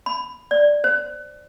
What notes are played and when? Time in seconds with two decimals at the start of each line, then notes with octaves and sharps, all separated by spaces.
0.06 B5
0.51 D5
0.84 C5